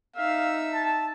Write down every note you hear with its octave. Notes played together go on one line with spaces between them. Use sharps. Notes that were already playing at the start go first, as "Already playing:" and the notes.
D#4 E5 F5
A5